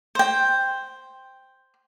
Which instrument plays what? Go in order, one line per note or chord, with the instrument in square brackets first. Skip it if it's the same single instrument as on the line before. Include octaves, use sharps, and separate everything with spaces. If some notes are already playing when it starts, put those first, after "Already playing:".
[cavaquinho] C5 G5